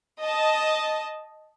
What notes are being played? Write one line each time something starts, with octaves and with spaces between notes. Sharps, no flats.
D#5 A5